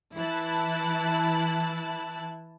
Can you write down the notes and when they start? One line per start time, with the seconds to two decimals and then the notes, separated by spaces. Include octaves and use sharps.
0.16 E3 E4 A5 F#6